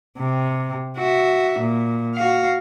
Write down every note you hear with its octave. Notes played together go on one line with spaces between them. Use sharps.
C3
F#4 E5
A#2
F#4 F5